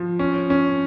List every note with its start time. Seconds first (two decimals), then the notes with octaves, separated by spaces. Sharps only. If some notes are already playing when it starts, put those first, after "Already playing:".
Already playing: F3
0.19 C#4
0.50 C#4